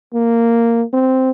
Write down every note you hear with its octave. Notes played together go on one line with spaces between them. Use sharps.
A#3
C4